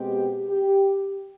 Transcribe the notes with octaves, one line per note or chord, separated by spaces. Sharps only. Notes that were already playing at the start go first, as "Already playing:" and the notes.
Already playing: B2 G#3 C4 G4
G4